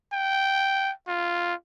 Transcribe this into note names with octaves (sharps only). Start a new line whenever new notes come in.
G5
F4